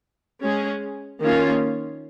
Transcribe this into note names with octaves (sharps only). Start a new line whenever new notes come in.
G#3 C#4 G#4
D#3 A#3 C#4 F4